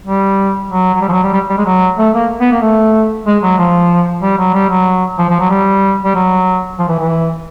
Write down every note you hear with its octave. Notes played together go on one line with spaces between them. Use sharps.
G3
F#3
F#3
G3
F3
F#3
G3
G3
G3
G#3
F#3
A3
A#3
B3
A#3
A3
G#3
F#3
F3
G3
F#3
G3
F#3
F3
F3
F#3
G3
G3
F#3
F3
E3
E3